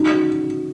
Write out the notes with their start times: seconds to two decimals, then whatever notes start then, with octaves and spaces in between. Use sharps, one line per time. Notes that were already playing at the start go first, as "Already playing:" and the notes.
Already playing: D#4 F#4
0.12 F#4